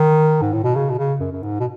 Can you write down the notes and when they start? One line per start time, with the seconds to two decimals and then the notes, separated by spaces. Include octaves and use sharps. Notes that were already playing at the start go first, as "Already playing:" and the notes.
Already playing: D#3
0.41 G#2
0.53 A2
0.64 B2
0.75 C#3
0.90 B2
0.98 C#3
1.20 F#2
1.32 F#2
1.43 G#2
1.60 B2